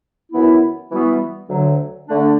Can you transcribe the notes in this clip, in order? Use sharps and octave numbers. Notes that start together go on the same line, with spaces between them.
F#2 E3 B3 E4
E3 G3 B3 F#4
D2 D3 F#3
D3 A3 D4